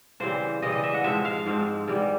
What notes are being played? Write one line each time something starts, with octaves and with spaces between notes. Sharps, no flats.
C#3 E3 G3 C4 C5
C#3 E3 G3 C4 D#5
D#5
E5
F#5
G#2 F3 G#3 C4 E5
F5
G#2 F3 G#3 C4
G#2 E3 G3